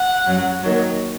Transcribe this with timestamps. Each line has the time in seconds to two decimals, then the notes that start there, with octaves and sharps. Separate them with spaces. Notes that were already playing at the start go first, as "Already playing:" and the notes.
Already playing: F#5
0.26 F#2 F#3
0.62 D#2 D#3 F#3